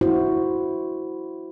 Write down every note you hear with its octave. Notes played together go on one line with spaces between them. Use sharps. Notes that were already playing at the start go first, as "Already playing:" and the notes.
E4 F#4 C5